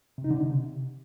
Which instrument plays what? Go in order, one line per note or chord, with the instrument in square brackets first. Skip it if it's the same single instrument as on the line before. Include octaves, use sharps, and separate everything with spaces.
[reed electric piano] C3
D#4
D3
C3